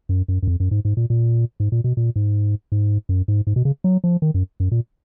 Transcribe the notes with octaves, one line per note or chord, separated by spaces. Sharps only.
F#2
F#2
F#2
F2
F#2
G#2
G#2
A#2
A#2
G#2
A#2
B2
A#2
G#2
G#2
F#2
G#2
G#2
B2
C#3
F#3
F3
D#3
F#2
F#2
A#2